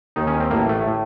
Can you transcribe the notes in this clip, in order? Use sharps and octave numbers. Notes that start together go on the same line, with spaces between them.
D#2 D#3 D#4
C#4
C4
A1 A2 A#3
A3
A2